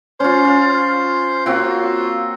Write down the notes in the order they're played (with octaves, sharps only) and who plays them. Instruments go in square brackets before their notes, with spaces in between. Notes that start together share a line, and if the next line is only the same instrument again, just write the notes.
[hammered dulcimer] C#4 F4 [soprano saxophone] C5
[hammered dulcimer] F4
[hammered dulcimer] A#3 C4 F#4 [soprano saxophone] F4